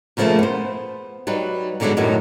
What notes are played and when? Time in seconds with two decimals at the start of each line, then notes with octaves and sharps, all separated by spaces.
0.17 A#2 C#3 F3 F#3 A3 A#3
0.39 B3 C5
1.27 F#3 G3 D#4 B4
1.80 G#2 B2 D3 D#3 F#3 G#3
1.97 F#2 A2 D#3 F#3 G3